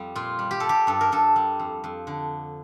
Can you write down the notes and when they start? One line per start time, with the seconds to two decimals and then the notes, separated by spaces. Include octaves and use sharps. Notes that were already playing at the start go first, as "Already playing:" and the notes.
Already playing: F2 G3
0.15 A#2 F4
0.39 G3
0.51 G4
0.60 G3 A4
0.69 G4
0.87 G2 A4
1.01 A#4
1.12 G2 A4
1.36 G3
1.59 F2
1.84 F2
2.07 D3